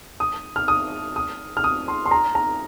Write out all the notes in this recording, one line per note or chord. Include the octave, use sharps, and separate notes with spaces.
D#6
F6
D#6
D#6
F6
D#6
C6
C6
A#5
A#5